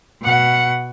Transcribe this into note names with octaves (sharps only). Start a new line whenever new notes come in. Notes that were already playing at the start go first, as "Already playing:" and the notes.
B2 F#5